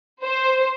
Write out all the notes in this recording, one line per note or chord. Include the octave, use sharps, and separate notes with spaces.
C5